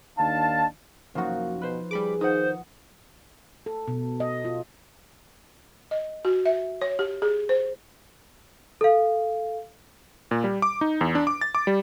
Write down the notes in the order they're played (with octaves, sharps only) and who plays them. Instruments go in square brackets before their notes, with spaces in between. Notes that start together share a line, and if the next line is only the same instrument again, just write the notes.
[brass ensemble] D#2 D4 D#4 F5 A5
[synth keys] F#2 F#4 [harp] F3 D#4 [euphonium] A#3
[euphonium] B2 [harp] B4 C5
[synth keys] G3 B5 D6 [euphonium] G#4
[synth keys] D#3 [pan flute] C5 [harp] F#5 D#6
[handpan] A4
B2
D#5
F4
[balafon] D#5
F#4
E5
C#5
G4
G#4
C5
[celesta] A4 F5
[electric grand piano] A#2
G3
D6
D#4
E2
D4
D6
A6
D6
G3